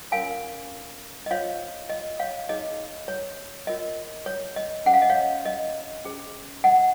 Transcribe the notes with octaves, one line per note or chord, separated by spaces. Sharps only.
C#4 F4 A#4 C#5 F5 G#5
D#5
F4 C5 C#5 F5
D#5
C#5 F5
D#4 G#4 C#5 D#5
C#5
F4 A#4 C#5 D#5
C#5
D#5
C#4 G#4 C5 F#5
F5
D#5
C#5 F5
D#5
C#4 G#4 C5
D#5 F#5